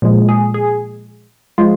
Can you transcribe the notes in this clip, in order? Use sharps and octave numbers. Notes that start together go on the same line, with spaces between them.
A#2 F3 G#3
G#4
G#4
F3 G#3 F4